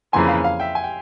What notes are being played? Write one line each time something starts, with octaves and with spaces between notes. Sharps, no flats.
F2 C#3 E3 A#3 G#5 C6
F5
F5
E5 G5
G#5
G5